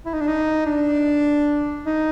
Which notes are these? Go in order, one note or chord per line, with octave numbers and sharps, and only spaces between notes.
E4
D#4
D4
D#4
D4
D#4